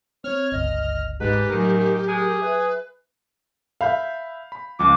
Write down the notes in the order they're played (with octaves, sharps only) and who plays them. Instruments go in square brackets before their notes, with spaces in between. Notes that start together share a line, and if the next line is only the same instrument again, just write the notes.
[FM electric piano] C4 [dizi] C#5 [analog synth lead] F6
[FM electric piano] G1 C#2 [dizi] D#5
[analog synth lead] G#2 [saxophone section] G3 B4 [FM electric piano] D#4 G#4 [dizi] G4
[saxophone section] F#2 D#3 [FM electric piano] A2 F#3 [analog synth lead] A#4
[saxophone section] G#4
[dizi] B4 [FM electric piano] E5
[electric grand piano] E5 B5 G6 [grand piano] F5
[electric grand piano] B5
[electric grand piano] C#2 F3 [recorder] D6